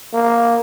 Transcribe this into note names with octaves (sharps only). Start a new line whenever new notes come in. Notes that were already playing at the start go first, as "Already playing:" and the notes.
A#3